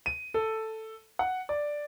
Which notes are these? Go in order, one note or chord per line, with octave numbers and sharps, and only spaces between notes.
D#7
A4
F#5
D5